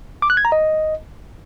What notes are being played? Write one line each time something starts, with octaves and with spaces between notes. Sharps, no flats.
D6
F#6
G#6
A#5
D#5